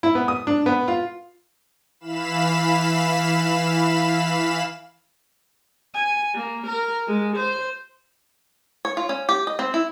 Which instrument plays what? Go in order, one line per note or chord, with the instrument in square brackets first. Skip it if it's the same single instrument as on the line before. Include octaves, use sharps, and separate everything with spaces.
[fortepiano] E4
B3
D#6
D4
B3
F4
[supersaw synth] E3 F5 B5 E7
[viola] G#5
A#3
A#4
G#3
C5
[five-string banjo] C#5
F4
C#4
G4
D#5
C4
E4